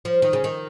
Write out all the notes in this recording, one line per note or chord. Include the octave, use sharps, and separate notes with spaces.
F3
D#3
C#3
D#3